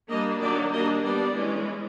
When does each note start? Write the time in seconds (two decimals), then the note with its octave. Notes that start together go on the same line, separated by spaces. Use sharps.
0.09 G3 A#3 D4 D#5
0.40 D#3 F#3 A#3 D4 D5
0.71 G3 A#3 D4 D#5
1.03 G3 B3 D4 D5
1.34 E3 G#3 C#4